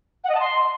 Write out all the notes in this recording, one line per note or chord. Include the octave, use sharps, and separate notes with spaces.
F#5
D#5
A5
C6